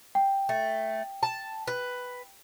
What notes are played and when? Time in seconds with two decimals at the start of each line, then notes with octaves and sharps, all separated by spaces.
0.15 G5
0.49 A3
1.23 A5
1.68 B4